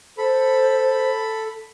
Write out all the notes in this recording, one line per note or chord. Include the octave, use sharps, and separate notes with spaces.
A4 C5 B5